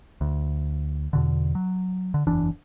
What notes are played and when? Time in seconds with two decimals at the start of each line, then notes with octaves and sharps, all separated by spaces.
0.21 D2
1.13 E2 B2 D3
1.55 F#3
2.14 D3
2.27 F#1 E2 E3 D4